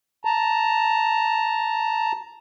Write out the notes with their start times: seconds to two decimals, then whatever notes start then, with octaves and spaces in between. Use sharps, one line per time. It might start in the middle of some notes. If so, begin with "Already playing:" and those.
0.25 A5 A#5